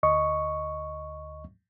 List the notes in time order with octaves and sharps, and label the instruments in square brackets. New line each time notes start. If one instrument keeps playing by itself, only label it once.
[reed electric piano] D2 D#5 C#6